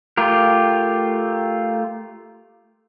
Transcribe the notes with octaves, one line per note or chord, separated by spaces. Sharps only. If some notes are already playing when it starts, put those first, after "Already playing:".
A3 F4 G4 A#4